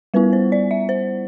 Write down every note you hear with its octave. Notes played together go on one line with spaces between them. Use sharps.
G3 B3 E4 B4
C5
D5
E5
C5